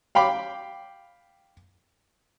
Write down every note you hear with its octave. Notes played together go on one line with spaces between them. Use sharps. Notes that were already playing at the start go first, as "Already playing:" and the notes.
F5 G5 B5 D6